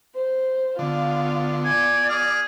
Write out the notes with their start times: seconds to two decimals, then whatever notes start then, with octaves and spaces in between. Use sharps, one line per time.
0.15 C5
0.79 D3 B3 F4 F5
1.65 D5 G#5
2.09 G#4 F6